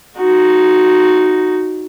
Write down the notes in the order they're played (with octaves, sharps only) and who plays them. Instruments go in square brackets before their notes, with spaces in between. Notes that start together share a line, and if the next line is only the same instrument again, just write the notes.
[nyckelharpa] D#4 F#4